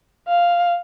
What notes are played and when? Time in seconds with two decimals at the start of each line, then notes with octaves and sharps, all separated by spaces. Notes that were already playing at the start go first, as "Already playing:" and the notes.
0.28 F5